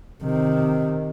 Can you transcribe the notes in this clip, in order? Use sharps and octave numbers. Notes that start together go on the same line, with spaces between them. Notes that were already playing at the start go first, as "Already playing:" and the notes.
C3 D#3